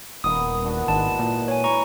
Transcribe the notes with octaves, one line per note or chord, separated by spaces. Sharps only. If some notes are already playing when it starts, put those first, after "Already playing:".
D#1 A#3 B3 D#5 D#6
E3 D4 F#4
G#1 E3 G#3 D4 A5
A#2
C#5 G#5
E4 A#5 C#6